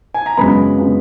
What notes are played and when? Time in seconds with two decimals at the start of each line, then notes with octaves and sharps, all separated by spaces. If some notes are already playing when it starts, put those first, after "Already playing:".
0.14 G#5
0.26 A#5
0.37 F#2 C#3 G#3 B3 B5
0.78 C#3 G#3 B3